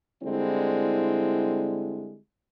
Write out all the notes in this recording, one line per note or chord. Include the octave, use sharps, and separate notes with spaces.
D3 G3 G#3 C4 E4